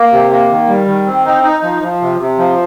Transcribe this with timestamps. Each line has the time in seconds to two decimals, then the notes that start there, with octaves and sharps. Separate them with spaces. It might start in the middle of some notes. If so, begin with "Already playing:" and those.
Already playing: A#3
0.12 C3
0.31 A#3
0.50 D#3
0.68 G3
0.87 D#3
1.06 C4
1.26 D#4
1.44 D#4
1.63 F3
1.82 F3
2.01 C3
2.20 C3
2.38 F3